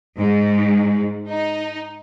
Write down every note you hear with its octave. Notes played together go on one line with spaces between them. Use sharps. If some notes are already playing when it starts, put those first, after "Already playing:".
G#2
D#4